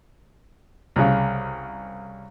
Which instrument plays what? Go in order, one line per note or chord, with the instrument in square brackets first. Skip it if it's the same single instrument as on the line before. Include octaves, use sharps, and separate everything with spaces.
[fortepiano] C2 C#3